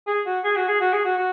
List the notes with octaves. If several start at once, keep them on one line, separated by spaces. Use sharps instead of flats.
G#4
F#4
G#4
F#4
G#4
F#4
G#4
F#4
F#4